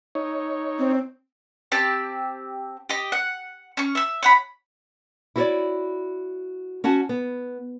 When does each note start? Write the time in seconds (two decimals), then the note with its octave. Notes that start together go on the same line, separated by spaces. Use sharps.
0.15 D#4 C#5
0.79 C4
1.72 C4 G4 A5
2.89 G4 D#5
3.12 F#5
3.77 C#4 C#6
3.95 E5 E6
4.23 C#5 F#5 B5
5.36 E4 F#4 A4 A#4 C#5 D5
6.84 C#4 F#4 F#5 A5
7.09 B3